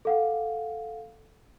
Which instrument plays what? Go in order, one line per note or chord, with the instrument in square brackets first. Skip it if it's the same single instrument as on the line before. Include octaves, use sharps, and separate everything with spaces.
[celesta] A4 F5 F#5